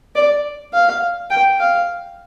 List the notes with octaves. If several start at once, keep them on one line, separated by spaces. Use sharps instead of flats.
D5
F5
G5
F5